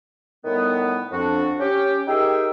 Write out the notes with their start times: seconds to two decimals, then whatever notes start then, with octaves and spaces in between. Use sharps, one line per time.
0.45 A2 D#3 G3 B3
1.11 F2 D4 F#4
1.60 C#4 G4
2.08 D#4 G4 G#4 A#4 E5 G5